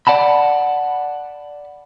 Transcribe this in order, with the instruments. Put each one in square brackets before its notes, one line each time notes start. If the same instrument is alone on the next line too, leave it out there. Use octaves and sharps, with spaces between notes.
[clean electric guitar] D5 F#5 A5 B5